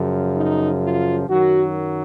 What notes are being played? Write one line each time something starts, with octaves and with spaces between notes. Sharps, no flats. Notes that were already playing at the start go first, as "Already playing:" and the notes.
Already playing: F#2 C#3 F3
D#4
F4
F#2 D#3 F#3 F#4